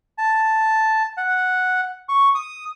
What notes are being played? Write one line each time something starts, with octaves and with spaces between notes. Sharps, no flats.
A5
F#5
C#6
D#6